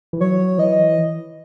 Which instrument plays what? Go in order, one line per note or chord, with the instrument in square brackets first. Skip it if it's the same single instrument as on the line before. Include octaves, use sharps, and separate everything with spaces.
[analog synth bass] E3
[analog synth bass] F#3 [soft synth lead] C#5
[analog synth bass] E3 [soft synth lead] D#5